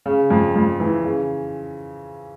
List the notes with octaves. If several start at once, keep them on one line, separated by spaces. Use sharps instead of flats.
C#3
F2
F2
E3
C#3